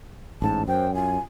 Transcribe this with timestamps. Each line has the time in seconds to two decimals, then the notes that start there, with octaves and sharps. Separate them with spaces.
0.42 A1 G#2 A5
0.68 F#2 C5 G5
0.95 F4 G#5